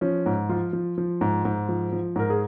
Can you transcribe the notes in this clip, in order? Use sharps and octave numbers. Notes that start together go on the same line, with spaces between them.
F3 C#4
G#2
F3 F4
F3
F3
G#2
G#2
F3
F3
G#2 A#4
G#4